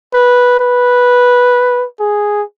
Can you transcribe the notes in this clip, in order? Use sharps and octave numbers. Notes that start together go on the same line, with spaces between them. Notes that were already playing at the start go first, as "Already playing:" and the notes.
B4
B4
G#4